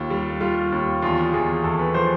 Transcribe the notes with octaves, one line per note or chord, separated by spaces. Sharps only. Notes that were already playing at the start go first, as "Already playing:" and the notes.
Already playing: D#2 F4
G3
G3 F4
D#2
E2 F4
E2 G#4
E2 A4
B4
F3 C5